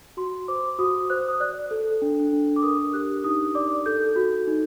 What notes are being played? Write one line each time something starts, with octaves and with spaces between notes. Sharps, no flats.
F#4 C6
C5 D6
F#4 D#6
C5 F#6
D#6
D5 F#6
A4
D4
D4
D6
A#4 D#6
G4 F#6
D#4 D#6
D5 D6
A4 G6
F#4
D#4